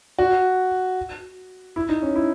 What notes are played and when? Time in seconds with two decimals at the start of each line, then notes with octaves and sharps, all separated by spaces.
0.18 F#4
1.76 E4
1.89 D#4
2.02 C#4
2.15 E4